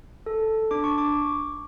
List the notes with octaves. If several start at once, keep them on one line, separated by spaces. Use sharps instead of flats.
A4
D4 D6
C#6
D6